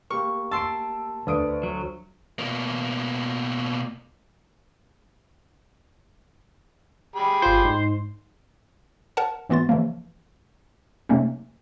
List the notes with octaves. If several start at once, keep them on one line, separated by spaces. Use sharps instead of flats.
A#3 G4 A#4 C#6
A5 C6 E6 D7
D2 B4 D5 D#6 D7
F#3
B2 A#3
G4 G#4 B5
G1 F4 C5
G#2 D#4 C6
A#4 F#5 A5
G#2 E3 B3 F#4 C6 A6
C#3 E3 F3 A#3
C3 F#3 A3 A#3 C#4 D#4